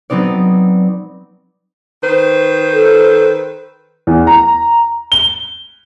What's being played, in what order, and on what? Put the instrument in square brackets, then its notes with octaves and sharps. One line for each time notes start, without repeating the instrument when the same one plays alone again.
[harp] F#3 B3 C4 D#4 D5
[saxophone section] D#3 B4 C5
[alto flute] A4
[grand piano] E2
A#5
G7